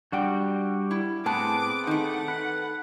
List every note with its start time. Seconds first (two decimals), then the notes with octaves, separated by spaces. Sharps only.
0.12 G3 D4 F#4 F#5 G5
0.91 E4
1.26 A2 B3 C4 G#4 B4 A5 D6
1.87 D#3 A3 D#4 F#5
2.28 B4